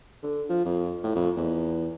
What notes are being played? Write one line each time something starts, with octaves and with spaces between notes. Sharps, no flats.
D3
F3
F2
A2
F2
E2